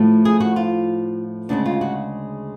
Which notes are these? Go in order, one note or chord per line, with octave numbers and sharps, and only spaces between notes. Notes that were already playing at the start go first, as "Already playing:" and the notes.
Already playing: A2 F3 A3
G#4
F#4
F4
D2 C#3 G#3 D4
F4
F#4